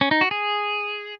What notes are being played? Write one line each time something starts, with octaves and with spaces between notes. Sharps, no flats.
C#4
D#4
F#4
G#4